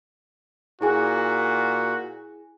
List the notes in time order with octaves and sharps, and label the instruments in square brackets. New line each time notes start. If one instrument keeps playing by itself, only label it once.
[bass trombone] A#2 [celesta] E4 G#4 G#5 [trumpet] F#4